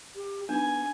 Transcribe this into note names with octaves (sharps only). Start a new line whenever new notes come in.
G4
B3 D4 D#4 G#5